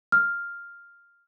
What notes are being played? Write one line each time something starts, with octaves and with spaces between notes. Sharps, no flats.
F6